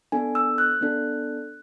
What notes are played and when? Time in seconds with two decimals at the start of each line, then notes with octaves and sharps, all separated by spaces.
0.12 B3 D4 A4 G#5
0.35 E6
0.58 F#6
0.81 B3 D4 A4